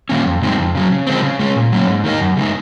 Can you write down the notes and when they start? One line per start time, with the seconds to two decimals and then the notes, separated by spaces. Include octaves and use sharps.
0.09 D#3 A#3 C#4
0.26 F2
0.42 C#3 G#3 C4 D#4
0.58 F2
0.75 C#3 F#3
0.91 C#3
1.07 F3 G#3 C4
1.23 C#3
1.39 G#3 C#4
1.56 A#2
1.72 F#3 A#3 C#4
1.88 G#2
2.04 D#3 A#3 D#4
2.20 F#2
2.37 C#3 G#3 D#4